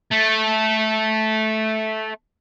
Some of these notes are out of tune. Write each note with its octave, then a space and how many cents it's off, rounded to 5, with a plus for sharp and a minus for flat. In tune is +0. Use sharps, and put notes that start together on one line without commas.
A3 -10